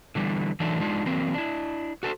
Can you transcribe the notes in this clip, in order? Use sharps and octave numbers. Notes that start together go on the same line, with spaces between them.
D3 E3 G3
E3 F#3 A3 D4 D#4
G#3 D4 D#4 F4
E3 F#3 A#3 C4
D4 E4
F#4 A4 B4 C5